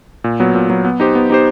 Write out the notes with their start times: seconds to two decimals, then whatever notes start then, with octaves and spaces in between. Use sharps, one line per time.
0.24 A#2
0.40 F#3 B3
0.55 A#2
0.70 F#3 B3
0.85 B3
1.00 D#4 G4 C5
1.15 B3
1.30 D#4 G4 C5